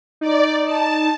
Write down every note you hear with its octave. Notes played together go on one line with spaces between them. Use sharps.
D#4 D5
A5